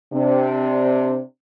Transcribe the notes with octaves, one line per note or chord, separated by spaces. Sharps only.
C3 C4 D4